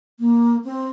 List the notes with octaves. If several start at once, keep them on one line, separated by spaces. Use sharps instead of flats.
A#3
C4